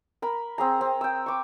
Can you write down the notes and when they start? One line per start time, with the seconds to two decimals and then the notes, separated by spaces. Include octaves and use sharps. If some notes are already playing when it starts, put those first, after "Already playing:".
0.22 A#4 B5
0.58 C4 G#4 A#5
0.81 C4
1.01 G5 E6
1.26 C#6 D6